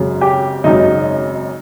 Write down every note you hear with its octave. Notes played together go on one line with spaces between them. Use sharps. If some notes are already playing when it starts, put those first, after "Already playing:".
Already playing: G#1 F#2 C#3 F#3
G4
G#1 F#2 C#3 F#3 D#4